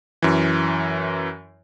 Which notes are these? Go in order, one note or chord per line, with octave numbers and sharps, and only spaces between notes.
F#2 E3